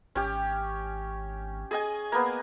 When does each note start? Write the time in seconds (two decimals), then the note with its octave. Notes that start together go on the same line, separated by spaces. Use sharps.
0.15 G#1 C#4 G4
1.71 G#4 D#5 G#5
2.12 A#3 B3